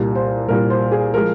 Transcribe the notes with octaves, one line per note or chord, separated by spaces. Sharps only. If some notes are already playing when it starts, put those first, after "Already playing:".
Already playing: C2 A#2 G3
C5
C2 A#2 G3 A#4
C5
G#4
F3 G#3 A#4